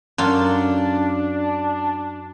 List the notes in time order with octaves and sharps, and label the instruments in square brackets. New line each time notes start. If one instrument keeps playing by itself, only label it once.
[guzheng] F#2 F4 A4 [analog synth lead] D4